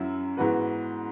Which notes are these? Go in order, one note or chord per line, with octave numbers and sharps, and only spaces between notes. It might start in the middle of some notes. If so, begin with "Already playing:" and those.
Already playing: F#2 F#3 E4
G#2 E3 B3 F#4 B4